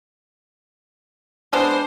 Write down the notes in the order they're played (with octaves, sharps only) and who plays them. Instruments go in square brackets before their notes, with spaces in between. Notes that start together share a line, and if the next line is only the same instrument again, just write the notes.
[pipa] G#3 B3 D4 [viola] C5